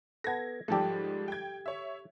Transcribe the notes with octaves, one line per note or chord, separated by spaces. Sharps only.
B3 A4 G#6 A#6
G#2 F3 G3 G4 A4
G5 G#6
C#5 E5